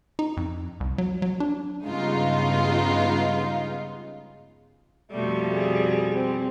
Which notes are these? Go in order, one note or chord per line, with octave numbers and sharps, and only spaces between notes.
D#4
F2
C2
F#3
F#3
D4
G2 C#3 G#3 B3 D#4 F4
F2 B2 G3 A3
G#4
C4